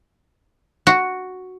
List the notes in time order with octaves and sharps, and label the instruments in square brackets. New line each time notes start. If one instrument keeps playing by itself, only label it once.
[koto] F#4